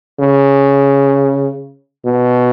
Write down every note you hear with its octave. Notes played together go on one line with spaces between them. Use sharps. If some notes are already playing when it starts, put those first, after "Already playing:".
C#3
B2